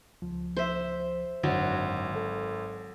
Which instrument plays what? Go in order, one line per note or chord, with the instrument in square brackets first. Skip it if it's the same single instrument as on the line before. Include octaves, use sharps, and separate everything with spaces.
[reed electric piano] C#2 F3
[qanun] C5 E5
[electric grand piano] G#1 [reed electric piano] F#2 D3 [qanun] F#3
[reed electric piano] A4